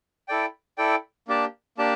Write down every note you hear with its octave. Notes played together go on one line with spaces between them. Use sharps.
E4 A4 D5 G5
E4 A4 D5 G5
A#3 D4 G4 D5 A5
A#3 D4 G4 D5 A5